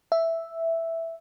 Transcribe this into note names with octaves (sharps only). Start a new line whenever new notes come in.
E5